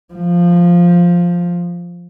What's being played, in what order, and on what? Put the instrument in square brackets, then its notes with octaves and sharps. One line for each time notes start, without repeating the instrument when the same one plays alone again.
[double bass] F3